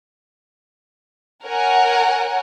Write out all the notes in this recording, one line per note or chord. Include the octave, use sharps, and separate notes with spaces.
A#4 C#5 F#5 G#5